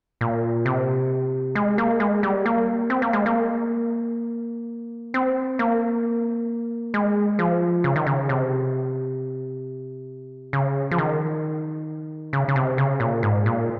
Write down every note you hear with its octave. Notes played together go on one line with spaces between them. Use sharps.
A#2
C3
G#3
A#3
G#3
G3
A#3
C4
A#3
G#3
A#3
C4
A#3
G#3
F3
C#3
D#3
C#3
C3
C#3
F3
D#3
C#3
C#3
C3
C#3
A#2
G#2
A#2